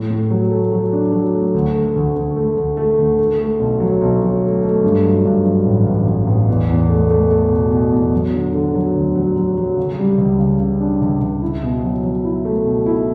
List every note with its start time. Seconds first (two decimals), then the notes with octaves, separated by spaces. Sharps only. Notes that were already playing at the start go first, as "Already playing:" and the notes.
Already playing: A2
0.10 A2
0.30 F#3
0.51 A3
0.72 F#3
0.93 D4
1.13 F#3
1.34 A3
1.54 D2
1.75 A3
1.96 D2
2.16 D2
2.37 A3
2.57 D2
2.77 A3
2.99 D2
3.19 A3
3.39 A3
3.59 B1
3.80 F#3
4.01 B1
4.22 F#3
4.42 A3
4.63 A3
4.84 G2
5.04 F#3
5.25 G2
5.45 F#3
5.66 A1
5.87 A1
6.07 A1
6.27 A1
6.47 E2
6.69 E2
6.89 A3
7.10 A3
7.31 A3
7.51 B2
7.71 B2
7.92 E2
8.13 F#3
8.34 D3
8.54 D3
8.75 F#3
8.95 D2
9.15 F#3
9.36 F#3
9.57 F#3
9.77 C#3
9.98 G3
10.18 C#2
10.39 C#3
10.59 C#3
10.80 D4
11.01 C#2
11.21 C#2
11.42 E4
11.63 B2
11.83 F#3
12.04 F#3
12.24 E4
12.45 A3
12.65 B2
12.86 E4